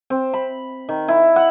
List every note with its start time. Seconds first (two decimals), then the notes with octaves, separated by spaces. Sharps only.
0.10 C4
0.34 B5
0.89 D#3
1.08 E4
1.36 F#5